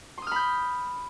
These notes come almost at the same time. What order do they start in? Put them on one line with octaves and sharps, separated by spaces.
C6 D#6 F6 B5 G6